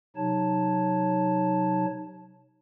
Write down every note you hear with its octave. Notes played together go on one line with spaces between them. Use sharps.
C3 F#3 D#4 C#5 A5